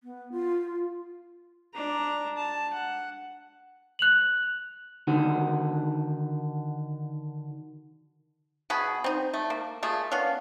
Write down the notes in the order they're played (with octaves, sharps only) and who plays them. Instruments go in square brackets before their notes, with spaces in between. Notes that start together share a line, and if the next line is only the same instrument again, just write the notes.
[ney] B3
F4
[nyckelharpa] D4 A#5
A5
F#5
[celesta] F#6 F7 F#7
[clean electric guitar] D3 D#3 F#4
[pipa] B2 B3 G#4 B5
C4 D#4
A3
A#3
A3 A#3 F4 G#4
B3 C#4 D4 F5